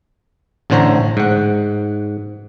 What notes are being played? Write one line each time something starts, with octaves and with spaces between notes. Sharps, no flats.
A1 A2 D3 C5 C#5 A#5
G#2 F#5